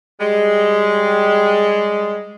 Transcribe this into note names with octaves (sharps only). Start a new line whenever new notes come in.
G3 G#3